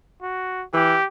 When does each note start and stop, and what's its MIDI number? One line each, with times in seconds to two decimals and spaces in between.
0.23 0.64 66
0.74 0.96 52
0.74 1.05 67